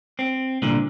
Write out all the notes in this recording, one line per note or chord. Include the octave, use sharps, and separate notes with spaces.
C4
C2 A#2 D3